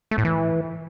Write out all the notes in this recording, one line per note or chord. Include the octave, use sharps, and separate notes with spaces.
A3
A2
E3